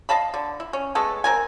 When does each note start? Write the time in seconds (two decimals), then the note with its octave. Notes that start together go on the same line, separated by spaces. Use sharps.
0.09 D#5 F5 A5 B5
0.34 D3
0.60 E4
0.73 C#4
0.95 G#3 A3 B3 A4
1.24 C4 D4 A#4 G#5